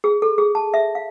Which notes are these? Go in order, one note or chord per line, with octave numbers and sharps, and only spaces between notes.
G#4
A4
G#4
A5
E5
F5